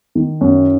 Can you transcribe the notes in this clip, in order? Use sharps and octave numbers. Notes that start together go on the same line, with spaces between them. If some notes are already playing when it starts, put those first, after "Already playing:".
D#3
F#2